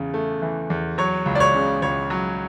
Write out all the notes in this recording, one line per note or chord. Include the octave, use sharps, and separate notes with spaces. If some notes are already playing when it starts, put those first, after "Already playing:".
Already playing: E2 C#3
A3
E3
E2
F#3 C#5
C#2
D5
C#5
C#3
C#2 C#5
F#3